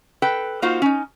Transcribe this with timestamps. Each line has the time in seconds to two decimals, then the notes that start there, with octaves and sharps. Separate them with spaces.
0.22 A4 B4 G5
0.62 A#3 D#4 F4 F#4 C5 F5
0.82 C#4 D#4